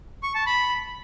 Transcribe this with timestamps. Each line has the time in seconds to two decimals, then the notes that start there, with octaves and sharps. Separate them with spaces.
0.23 C#6
0.35 A5
0.46 B5